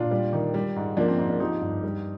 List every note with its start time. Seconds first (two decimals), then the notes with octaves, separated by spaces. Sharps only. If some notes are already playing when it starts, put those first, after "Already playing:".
Already playing: A#2 D4 F4
0.11 G3
0.33 D#3
0.54 G3
0.76 G#2
0.97 F3 A#3 D4
1.08 C4
1.18 G#2 C4
1.29 A#3 D4
1.40 F3 D#4 G4
1.62 G2
1.83 G3